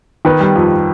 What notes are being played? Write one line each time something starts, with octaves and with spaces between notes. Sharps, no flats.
D#3 B4
G3
F2